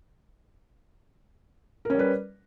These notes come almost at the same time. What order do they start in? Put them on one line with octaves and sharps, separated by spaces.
A#4 C#4 G3 B4